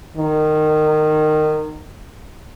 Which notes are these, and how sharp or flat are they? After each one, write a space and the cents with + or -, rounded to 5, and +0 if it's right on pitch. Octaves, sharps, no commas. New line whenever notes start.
D#3 -20